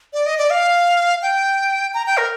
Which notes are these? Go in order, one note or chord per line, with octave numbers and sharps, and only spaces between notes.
D5
D#5
D5
F5
G5
A#5
G5
A#4